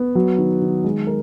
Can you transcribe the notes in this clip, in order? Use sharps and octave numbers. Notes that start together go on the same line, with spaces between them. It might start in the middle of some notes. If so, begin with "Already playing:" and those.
Already playing: B3
F#3
D#3
D#3
G#3
A#4